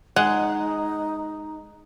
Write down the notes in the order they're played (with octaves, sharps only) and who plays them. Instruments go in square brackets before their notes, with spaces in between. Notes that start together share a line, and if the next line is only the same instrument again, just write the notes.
[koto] G#3 [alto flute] D#4 [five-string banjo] F#5